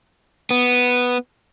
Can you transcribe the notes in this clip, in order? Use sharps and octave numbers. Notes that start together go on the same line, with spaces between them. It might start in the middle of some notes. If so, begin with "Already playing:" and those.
B3